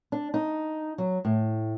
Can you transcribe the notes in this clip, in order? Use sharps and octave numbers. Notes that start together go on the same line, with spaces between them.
D4
D#4
F#3
A2